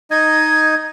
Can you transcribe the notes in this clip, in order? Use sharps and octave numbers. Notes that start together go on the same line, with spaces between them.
D#4 D#5 G#6